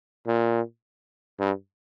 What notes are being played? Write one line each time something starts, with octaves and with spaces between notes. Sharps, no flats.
A#2
G2